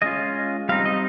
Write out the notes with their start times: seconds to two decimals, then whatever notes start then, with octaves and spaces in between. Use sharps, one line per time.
0.02 G#3 C#4 F4 D#5
0.69 G3 C4 D#4 F5
0.86 D#5